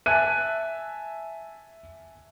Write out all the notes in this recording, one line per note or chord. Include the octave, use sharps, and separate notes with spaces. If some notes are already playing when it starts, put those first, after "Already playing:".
E5 G#5 A5 F#6 D#7